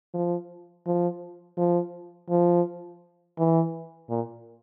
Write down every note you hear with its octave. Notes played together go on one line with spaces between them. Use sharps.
F3
F3
F3
F3
E3
A#2